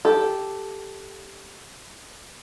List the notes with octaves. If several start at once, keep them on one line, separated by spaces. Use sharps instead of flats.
G4 A4